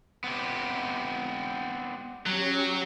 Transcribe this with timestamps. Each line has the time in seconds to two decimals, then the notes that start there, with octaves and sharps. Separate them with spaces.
0.24 B3 C4 G4
2.26 F#3 C#4 G4